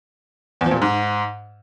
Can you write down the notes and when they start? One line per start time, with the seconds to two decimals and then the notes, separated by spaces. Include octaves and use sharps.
0.61 E2
0.66 F3
0.71 A#2
0.76 C3
0.82 G#2